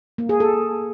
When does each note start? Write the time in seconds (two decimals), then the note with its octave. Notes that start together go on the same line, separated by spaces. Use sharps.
0.18 A#3
0.29 G#4
0.40 A4